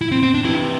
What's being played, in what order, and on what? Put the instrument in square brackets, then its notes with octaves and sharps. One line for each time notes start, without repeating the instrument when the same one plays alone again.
[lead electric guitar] E4
C4
C4
D4
[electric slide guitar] C3 E3 [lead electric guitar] E4